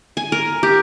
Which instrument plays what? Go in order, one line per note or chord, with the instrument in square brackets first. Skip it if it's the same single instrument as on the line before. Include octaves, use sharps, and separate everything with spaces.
[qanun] G#5
A#4
G4